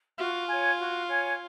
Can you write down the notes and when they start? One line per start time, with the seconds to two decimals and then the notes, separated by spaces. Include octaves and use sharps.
0.18 F4 F#4
0.48 C#5 G#5
0.79 F#4
1.09 C#5 G#5